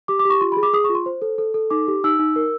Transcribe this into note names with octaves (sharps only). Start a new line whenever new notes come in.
G4 D6
D6
G4 C#6
F4 C6
G#4 B5
D6
G#4 D#6
F4 C#6
C6
C5
A4
A4
A4
D#4 D6
G4
D#4 E6
D#4
A#4